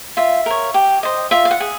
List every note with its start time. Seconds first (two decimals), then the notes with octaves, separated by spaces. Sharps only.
0.17 F4 E5
0.46 A#4 C#5
0.74 G4
1.03 C5 D#5
1.31 F4 E5
1.45 F5
1.51 F#5
1.60 G#4